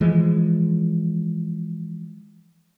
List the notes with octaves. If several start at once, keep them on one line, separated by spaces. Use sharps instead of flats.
E3 F3 G#3